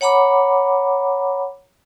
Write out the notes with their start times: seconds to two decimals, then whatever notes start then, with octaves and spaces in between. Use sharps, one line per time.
0.01 C#5 F#5 A#5 B5 D6